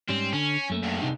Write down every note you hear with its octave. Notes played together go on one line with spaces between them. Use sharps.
G#2 G3 C4 C#4
D3 C#4
F#2 A3 A#3
E2 G2
C3 D#4